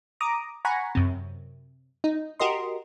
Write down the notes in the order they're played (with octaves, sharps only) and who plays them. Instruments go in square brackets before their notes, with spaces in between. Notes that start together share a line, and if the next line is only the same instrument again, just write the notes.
[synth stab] A#5 D6 D#6
F#5 G#5 A#5 B5 C#6
F#2 C3
D#4
F#4 G4 A#4 D#5 C6